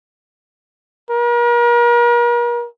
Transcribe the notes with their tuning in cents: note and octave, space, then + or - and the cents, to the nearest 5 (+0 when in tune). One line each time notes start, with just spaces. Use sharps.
A#4 +40